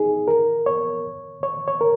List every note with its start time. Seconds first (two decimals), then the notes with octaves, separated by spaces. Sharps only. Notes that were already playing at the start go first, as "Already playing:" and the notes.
Already playing: D#4 G#4
0.28 A#4
0.66 C#5
1.43 C#5
1.68 C#5
1.81 A#4